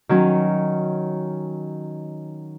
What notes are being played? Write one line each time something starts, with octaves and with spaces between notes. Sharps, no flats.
D#3 F#3 C#4